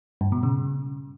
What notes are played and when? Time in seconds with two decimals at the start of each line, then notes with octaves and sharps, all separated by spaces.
0.21 G2
0.32 B2
0.43 C#3